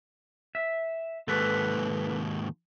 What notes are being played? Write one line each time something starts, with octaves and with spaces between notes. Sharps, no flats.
E5
D#2 G#2 A4 B4